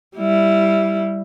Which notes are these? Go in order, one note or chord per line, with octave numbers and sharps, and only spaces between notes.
G3 E4